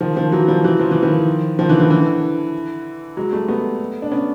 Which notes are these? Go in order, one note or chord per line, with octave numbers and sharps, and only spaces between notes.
D#3 F3
D#3 F3
E3 F#3
F3 G3
E3 F#3
F3
E3
D#3 F3
D#3 F3
D3 E3
D3 E3
D3 E3
F#3 G#3
G3 A3
A3 B3
D4
B3 C#4